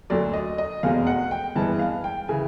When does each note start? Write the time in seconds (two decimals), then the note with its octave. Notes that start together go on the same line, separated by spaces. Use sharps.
0.10 D2 D3 F#3 D5
0.33 D#5
0.58 D#5
0.83 F1 E2 B2 G#3 F5
1.07 F#5
1.31 G5
1.56 G2 E3 G#3 B3 A5
1.79 F5
2.04 G5
2.28 C#3 E3 G#5